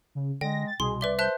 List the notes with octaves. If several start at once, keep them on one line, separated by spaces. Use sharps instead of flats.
C#3
D3 G#3 G5 A#6
A6
C2 B2 G#4 C6
B4 D5 E5 G7
C5 E5 A5 F#6 G6